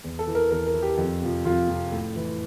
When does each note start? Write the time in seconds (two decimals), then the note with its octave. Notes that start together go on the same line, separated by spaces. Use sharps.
0.04 E2
0.19 A4
0.27 E3
0.35 A#4
0.50 E2 A#4
0.67 A#4
0.74 E3
0.82 G4
0.97 F2
1.22 C3 F3
1.45 F2 F4
1.68 C3 F3
1.92 A2
2.16 E3